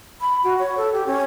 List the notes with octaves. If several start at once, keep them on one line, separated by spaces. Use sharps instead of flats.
B5
F#4
C#5
A4
G4
C#4